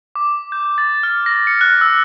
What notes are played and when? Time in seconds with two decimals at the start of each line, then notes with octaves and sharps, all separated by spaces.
0.15 D6
0.52 G6
0.78 A6
1.03 F6
1.26 A#6
1.47 C#7
1.61 F#6
1.81 E6